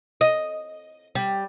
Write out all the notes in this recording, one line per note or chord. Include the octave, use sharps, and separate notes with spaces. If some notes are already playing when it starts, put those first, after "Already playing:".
D#5
G3